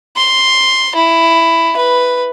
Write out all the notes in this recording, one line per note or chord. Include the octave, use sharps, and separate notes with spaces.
C6
E4
B4